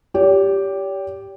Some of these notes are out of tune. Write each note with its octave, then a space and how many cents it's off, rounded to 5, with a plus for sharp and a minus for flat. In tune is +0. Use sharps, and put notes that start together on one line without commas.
G4 +0 C#5 +45